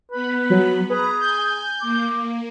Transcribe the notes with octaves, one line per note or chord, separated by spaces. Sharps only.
B3 B4 B5
F#3
G#4 B4 A#5
G#5 G6
A#3 D6